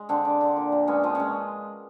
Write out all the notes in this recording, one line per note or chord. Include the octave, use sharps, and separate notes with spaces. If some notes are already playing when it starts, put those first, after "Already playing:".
Already playing: G#3
D3 C4 D4
D3
D3
A#2
A#2
G#3 B3 C#4
F3 C4
G#3 C#4